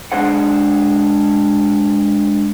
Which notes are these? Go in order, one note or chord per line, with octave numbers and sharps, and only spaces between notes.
G#3 D4 G#4 C5 F#5